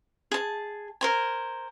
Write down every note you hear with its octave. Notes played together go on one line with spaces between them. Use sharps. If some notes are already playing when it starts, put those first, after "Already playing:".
G#4 A5
A#4 C5 G#5